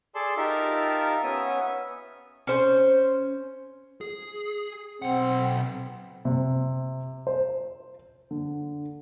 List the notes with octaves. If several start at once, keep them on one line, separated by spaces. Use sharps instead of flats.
G#4 A4 D5 A5 C6
D#4 F4 G4 A#4 E5 A5
B3 C#4 E5 D#6
C#4 C5
G#4
B1 C4 F#5
C3
C5
D3